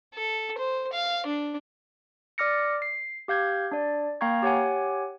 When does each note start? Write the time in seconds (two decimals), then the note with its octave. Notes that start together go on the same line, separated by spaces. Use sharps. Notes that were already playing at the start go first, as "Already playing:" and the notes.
0.14 A4
0.58 C5
0.93 F5
1.26 D4
2.38 D5 D6 F6 A#6 C#7
2.82 C7
3.28 G4 F5 G6 G#6
3.71 D4 D5
4.21 A#3 F5 G5 A#5 C#6 G#6
4.42 G4 C#5 F#5 G#5